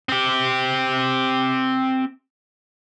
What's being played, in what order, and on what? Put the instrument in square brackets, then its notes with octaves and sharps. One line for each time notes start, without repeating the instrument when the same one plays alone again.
[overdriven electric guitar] C4 G4